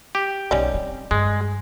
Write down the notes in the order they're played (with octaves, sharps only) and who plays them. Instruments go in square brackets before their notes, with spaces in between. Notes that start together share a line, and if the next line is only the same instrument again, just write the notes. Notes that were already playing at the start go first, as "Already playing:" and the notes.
[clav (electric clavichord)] G4
[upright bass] B1 [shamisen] G3 C#4 D#4
[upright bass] C4
[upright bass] G2 [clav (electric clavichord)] G#3